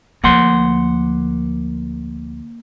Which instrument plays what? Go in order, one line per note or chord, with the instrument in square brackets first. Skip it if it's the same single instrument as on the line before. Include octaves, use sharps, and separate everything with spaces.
[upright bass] D2 F3 [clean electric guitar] A#3 F#5 C6